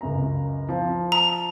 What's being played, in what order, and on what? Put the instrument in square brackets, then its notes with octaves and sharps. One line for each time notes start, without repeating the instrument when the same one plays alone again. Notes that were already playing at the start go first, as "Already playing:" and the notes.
[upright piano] C#2 F#2 A#5
F3
[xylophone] A#5